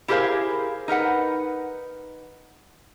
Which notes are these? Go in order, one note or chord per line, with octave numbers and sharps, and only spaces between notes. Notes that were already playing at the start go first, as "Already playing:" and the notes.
E4 G4 G#4 A#4 C5 F5
D#4 A#4 B4 F#5